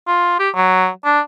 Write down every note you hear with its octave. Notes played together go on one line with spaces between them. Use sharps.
F4
G4
F#3
D4